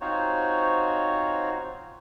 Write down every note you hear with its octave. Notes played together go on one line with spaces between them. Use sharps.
C4 D#4 F4 F#4 C5 C#5